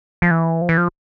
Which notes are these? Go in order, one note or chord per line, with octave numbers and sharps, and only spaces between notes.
F3
E3
F3
E3
F3